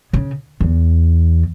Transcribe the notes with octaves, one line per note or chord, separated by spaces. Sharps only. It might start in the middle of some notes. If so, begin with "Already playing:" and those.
C#3
E2